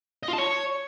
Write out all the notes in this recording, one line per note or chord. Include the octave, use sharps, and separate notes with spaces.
D#5
F4
A5
C#5